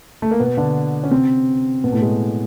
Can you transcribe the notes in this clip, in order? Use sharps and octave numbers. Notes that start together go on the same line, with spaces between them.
A3
A#3
B2 B3
D3 D4
C#4
C3 C4
B2 B3
A2 A3
G#3